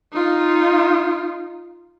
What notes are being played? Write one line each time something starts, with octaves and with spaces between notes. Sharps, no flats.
D#4 F4